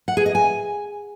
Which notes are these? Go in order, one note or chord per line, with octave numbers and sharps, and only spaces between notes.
F#5
G#4
D#5
G#5